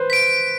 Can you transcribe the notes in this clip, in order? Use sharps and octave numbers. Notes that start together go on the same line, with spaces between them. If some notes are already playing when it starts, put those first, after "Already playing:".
Already playing: B4 C5
B6 D7